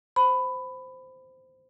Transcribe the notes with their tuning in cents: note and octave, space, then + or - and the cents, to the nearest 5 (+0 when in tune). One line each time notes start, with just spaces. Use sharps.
C5 -10 B5 +15